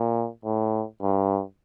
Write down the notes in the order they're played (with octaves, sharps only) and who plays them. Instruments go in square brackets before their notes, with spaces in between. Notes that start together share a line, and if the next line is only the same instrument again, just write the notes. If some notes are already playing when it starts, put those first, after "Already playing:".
Already playing: [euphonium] A#2
A2
G2